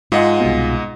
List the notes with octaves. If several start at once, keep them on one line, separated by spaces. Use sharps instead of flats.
G#2 F4 G#4 D#5 F#5
C2 B2